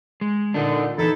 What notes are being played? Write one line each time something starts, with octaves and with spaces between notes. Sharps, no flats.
G#3
A#2 D3 D4 D#4
E2 E3 D#4 E4 A4